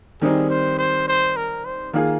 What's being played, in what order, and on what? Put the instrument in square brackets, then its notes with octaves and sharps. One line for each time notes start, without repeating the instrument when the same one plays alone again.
[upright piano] D#3 G3 C4 D#4 [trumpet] G#4
[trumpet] C5
C5
C5
A#4
C5
[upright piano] D#3 A#3 F4 G#4